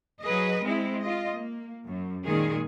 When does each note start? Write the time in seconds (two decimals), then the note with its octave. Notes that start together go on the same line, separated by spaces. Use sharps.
0.21 F#3 G#4 B4 D#5
0.62 G#3 C4 E4
0.99 F4 D#5
1.33 A#3
1.85 F#2
2.25 A#2 D#3 G#3 G#4